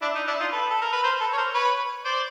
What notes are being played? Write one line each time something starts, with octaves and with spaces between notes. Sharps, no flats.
D4 E4
D#4
D4 E4
D#4 F4
A4 B4
A4
A#4
B4
A#4 C5
A4 B4
C#5
A#4 C5
B4 C#5
C5 D5